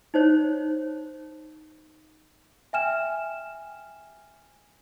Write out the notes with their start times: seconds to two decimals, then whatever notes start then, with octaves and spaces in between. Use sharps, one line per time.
0.14 D#4 C5 C#5
2.73 E5 G5 G#5 F6 E7